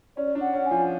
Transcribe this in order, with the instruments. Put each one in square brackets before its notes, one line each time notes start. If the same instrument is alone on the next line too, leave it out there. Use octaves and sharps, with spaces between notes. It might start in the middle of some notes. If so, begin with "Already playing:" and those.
[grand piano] C#4 [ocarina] D5
[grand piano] D4
[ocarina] F#5
[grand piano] C#4
[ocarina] G#5
[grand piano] F3